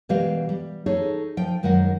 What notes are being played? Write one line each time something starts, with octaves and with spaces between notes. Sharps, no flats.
B2 E3 G3 G#3 G4 F5
G3
D#4 G#4 A4 C#5
F3 G5
F#2 D#3 G#3 C5 F#5